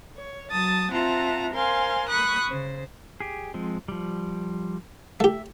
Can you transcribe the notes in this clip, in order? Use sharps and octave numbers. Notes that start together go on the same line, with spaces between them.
C#5
F#3 A5 D#6 A6
C4 F4 E5 F#5 A5 A#5
A#4 C5 F5 G#5 C6
B5 C#6 D#6 F#6
C#3 C5
G4 G#4
F3 G#3 C4
F3 G3
A3 G4 E5